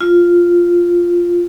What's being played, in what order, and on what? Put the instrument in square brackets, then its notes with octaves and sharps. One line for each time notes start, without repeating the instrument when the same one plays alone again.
[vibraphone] F4